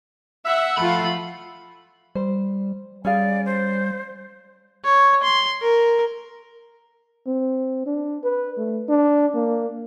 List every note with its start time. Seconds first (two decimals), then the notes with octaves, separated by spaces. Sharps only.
0.46 E5 F#5
0.78 F3 A3 F4 B5
2.15 G3 C5
3.05 G3 C#4 G#4 D5 F5
3.46 C5
4.84 C#5
5.23 C6
5.62 A#4
7.27 C4
7.86 D4
8.24 B4
8.58 A3
8.89 D4
9.35 A#3